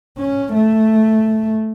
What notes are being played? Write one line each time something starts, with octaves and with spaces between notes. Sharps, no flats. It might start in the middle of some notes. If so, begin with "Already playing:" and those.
C#4
A3